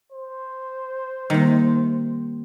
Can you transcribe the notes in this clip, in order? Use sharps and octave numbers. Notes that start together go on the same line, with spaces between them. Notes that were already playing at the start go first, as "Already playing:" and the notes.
C5
C3 D#3 G3 A#3